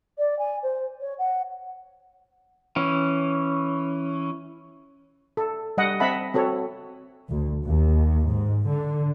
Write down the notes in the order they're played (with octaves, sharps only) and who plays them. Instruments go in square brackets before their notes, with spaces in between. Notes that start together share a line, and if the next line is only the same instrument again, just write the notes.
[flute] D5
G#5
C5
C#5
F#5
[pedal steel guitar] E3 C#4
[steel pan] A4
G3 D#5 F#5
C4 D#5 E5 F#5 A5 B5
C4 F#4 A4 C#5
[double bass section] D2
D#2
G#2
D3